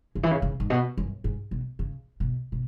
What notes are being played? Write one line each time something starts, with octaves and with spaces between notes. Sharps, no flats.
C#3
E3
C#3
C#3
G#2
B2
F#2
G#2
B2
C#3
B2
B2